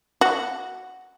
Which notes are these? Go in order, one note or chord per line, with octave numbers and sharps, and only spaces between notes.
F#4